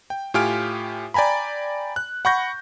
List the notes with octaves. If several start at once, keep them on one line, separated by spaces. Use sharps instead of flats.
G5
A2 F4 G4 G#5 F6 D7
D5 G5 G#5 A#5 B5
F#6
F#5 B5 C#6 G6 A#6